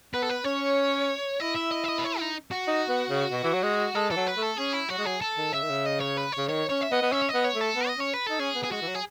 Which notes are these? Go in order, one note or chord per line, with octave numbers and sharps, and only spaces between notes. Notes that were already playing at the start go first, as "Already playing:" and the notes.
B3 B4
A4
B4
C#4 C#5
E4 D#5
E5
D#5
E5
D#5
B4
C#5
D#4
F#4
D#4
B3
C#3
B2
E3
F#3
G#3
G#3 A4
E3 A4
F#3
B4
A3
A4
C#4 G#4
E4
F#3 F#4
G#3
F#3 G#4
A4
D#3
C#3 E5
D#3
C#3
D#5
C#5
B4
C#5
C#3
D#3 C#5
C#4 C#5
E5
B3 D#5
B3
C#4 E5
C#5
D#5
B3
C#5
A3
A4
B3
D#5
C#4 C#5
B4
D#4 A4
C#4 G#4
B3
G#4
G#3 F#4
E3
F#3
G#4